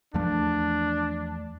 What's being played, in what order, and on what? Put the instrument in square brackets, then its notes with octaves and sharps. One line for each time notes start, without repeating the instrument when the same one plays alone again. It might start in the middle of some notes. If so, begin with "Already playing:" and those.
[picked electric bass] E2 F3 A3 [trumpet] D4